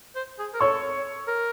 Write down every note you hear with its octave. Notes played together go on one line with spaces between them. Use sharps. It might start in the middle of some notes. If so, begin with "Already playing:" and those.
C5
G#4
A#4
A4 C#5 C#6
A#4